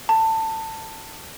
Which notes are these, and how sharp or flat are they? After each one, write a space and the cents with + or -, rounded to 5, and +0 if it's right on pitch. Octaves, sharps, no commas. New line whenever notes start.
A5 +20